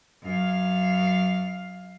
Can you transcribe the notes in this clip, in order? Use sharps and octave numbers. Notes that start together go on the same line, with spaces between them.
F#2 F5